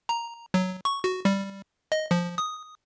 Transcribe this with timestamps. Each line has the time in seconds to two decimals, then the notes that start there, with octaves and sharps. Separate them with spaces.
0.09 A#5
0.54 F#3
0.85 C#6
1.04 F#4
1.25 G3
1.92 D#5
2.11 F3
2.38 D#6